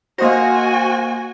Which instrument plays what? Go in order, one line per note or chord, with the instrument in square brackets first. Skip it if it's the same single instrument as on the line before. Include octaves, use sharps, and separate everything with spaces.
[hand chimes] A#3 A#6 [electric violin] F#4 G#5 [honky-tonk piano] C5 D#5 F5